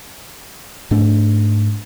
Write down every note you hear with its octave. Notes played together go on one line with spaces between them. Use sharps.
G#2 A3 D4